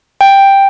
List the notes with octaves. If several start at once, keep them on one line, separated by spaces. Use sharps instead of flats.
G5